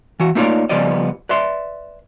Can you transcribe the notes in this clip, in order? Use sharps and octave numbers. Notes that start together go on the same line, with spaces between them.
E3 F#4
A3 A#3 D#4 F4 C#5 D5
C#3 F3 G3 B3 D5 D#5
B4 D5 E5 C6